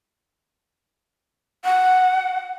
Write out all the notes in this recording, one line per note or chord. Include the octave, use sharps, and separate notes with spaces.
F#5